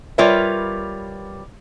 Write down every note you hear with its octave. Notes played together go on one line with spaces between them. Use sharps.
G3 F4 A#4 B4 C#5 E5